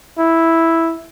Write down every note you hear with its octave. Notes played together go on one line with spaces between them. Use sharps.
E4